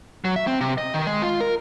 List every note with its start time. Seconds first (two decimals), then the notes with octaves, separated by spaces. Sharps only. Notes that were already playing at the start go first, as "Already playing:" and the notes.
0.25 F#3
0.36 E5
0.47 C4
0.61 C3
0.78 D#5
0.94 D#3
1.07 G#3
1.22 F4
1.40 A#4